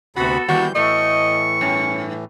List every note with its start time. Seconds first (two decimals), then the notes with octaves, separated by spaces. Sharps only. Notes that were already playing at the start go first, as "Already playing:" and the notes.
0.16 D2 C3 B3 F#4 A4 B5
0.49 D#2 E3 G3 F#4 G6
0.75 A2 E3 A3 D#5 C#6
1.61 G2 C#4